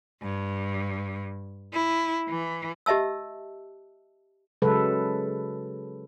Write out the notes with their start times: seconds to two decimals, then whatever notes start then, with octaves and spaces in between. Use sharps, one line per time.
0.23 G2
1.74 E4
2.29 E3
2.86 G4 D#5 E5 A5 E6
4.62 C#3 F#3 G#3 A4 B4